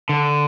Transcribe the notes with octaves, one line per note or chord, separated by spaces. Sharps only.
D3